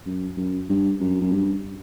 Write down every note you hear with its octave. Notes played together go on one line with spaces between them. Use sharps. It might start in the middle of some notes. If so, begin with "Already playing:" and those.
F#2
F#2
G2
F#2
F#2
G2